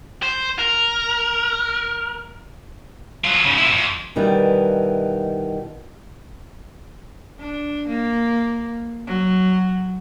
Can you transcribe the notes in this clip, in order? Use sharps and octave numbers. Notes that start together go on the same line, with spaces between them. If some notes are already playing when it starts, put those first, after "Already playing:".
C5
A#4
F#3 F4
G#2 C#3
A#2 E4
F2
B2 D#3 E3 G3
D4
A#3
F#3